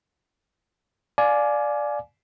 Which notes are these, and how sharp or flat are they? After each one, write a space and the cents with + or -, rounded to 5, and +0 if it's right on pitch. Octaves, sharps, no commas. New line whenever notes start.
D5 +0 F5 +5 G#5 +25